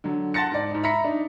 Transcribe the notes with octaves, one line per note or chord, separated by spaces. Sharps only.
D3 F#3
F#5 A5 C6 A6 A#6 C#7
G#2 D5
G#2 D#4
E5 A#5 B5 A#6 B6 C#7
D4 D#4